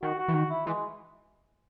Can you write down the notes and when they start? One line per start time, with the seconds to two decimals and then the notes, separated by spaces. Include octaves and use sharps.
0.02 D#3 F#4
0.18 F#4
0.28 E3
0.34 D#3 F#4
0.50 E4
0.66 E3 G#3